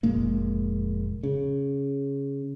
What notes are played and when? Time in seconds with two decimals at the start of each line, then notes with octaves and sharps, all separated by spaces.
0.03 F1 A#2 G#3 A#3
1.23 C#3